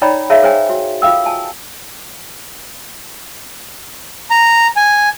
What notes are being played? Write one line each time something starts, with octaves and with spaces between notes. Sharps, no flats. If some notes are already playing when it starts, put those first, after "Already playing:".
D#4 C#5 D5 G5 A#5 B5
G#4 A#4 C#5 E5 F5 A5
G#4 A#4 C5 C#5 G5 G#5
F#4
F4 A4 F5 G5 E6
G#5 A5
A#5
G#5